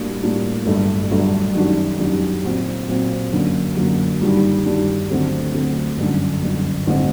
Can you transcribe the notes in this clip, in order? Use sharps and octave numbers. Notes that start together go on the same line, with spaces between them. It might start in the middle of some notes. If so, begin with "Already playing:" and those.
Already playing: A2 G3 A#3 D4 F#4
A2 G3 A#3 D4 F#4
G1 G2 F#3 A3 D4
G1 G2 F#3 A3 D4
F#2 D#3 G3 D4 F#4
F#2 D#3 G3 D4 F#4
A#2 F#3 C4 F#4
A#2 F#3 C4 F#4
F#2 D3 F#3 A#3 D4
F#2 D3 F#3 A#3 D4
G2 D#3 G3 D4 F#4
G2 D#3 G3 D4 F#4
D2 D3 F#3 A3 C4
D2 D3 F#3 A3 C4
G1 F#2 D3
G1 F#2 D3
A1 G2 D3 A3 C4